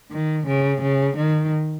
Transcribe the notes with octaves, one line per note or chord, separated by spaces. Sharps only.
D#3
C#3
C#3
D#3